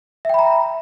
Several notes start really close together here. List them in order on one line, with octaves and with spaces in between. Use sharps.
E5 G5 B5 A#5